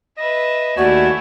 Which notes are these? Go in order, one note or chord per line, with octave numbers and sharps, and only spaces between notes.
B4 D#5 E5
D#2 A3 E4 F#4 D5 G#5 C#6